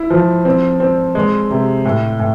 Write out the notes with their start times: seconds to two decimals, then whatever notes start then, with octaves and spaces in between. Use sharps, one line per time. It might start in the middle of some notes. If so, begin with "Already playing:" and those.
Already playing: E4
0.10 F3
0.45 C4
0.80 C4
1.15 G#3
1.50 C3
1.85 A2
2.19 A2